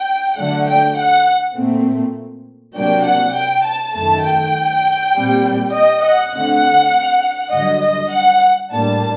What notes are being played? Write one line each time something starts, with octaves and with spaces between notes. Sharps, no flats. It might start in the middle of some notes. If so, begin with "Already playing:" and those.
Already playing: G5
D3 F#3 A3 D4 F#5
G5
F#5
A#2 A3 C4
C3 F#3 A#3 D4 G5
F#5
G5
A5
F#2 D#3 A3 A5
G5
A#2 G3 C4
D#5
F#5
D3 A3 C4
G2 D3 F#3 D#5
D#5
F#5
A2 G3 A#3 D4 A5